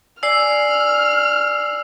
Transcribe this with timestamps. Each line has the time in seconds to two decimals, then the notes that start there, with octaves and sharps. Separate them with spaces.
0.23 D5 G#5 E6 F6 C7